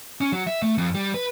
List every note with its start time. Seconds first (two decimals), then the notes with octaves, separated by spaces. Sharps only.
0.21 C#4
0.32 F#3
0.47 E5
0.62 A3
0.78 F2
0.95 G3
1.14 B4